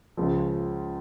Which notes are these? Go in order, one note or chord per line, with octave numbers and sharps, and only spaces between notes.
C#2 C#3 F3